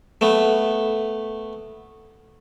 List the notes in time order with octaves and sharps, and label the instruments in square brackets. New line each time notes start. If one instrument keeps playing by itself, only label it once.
[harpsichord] A3 B3